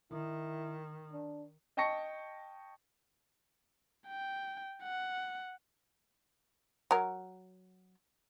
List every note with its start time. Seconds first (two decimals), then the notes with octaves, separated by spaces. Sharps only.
0.11 D#3 E4
1.12 D4
1.77 D#5 G5 A5 C#6 A#6 C#7
4.08 G5
4.83 F#5
6.91 F#3 A#4